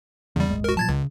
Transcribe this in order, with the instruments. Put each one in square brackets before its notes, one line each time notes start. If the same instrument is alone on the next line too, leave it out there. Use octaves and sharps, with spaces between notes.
[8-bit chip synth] E2 G3 [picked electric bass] C#3 E3
[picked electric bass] D#1 G#1 G#3
[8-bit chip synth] F#4 A#4
[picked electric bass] A#2 F3 F#3 [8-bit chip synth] A5 G#6 A6
[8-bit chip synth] C#2 [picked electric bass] C#3